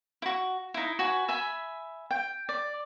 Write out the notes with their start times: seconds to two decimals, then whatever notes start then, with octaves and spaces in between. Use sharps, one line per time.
0.22 E4 F#4
0.74 D#4 E4
0.99 F#4 B4 G#5
1.28 E5 G#5 B5
2.11 G5
2.49 D5